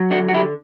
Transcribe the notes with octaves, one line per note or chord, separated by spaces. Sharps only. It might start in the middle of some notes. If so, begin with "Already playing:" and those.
Already playing: F#3
D3 D4 F#4
F#4
D3 E4 G4